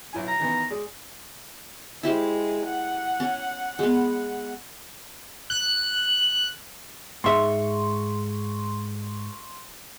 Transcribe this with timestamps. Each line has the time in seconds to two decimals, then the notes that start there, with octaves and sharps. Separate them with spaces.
0.13 B1 E4 G#5
0.28 A#5
0.40 D#3 E3 B3
0.70 G#3 G#4 D5
2.03 G#3 E4 G4 C5
2.65 F#5
3.20 C#4
3.79 G#3 B3
5.50 F#6
7.24 G#2 E5 C6 C#6